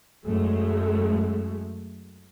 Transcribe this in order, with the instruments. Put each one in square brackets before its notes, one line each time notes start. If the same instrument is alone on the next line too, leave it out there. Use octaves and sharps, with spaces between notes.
[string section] F#2 G#3 A3